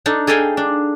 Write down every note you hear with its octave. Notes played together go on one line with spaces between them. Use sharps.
D4 D#4 A4
G#4 A4 D#5 F5 G5 G#5
D4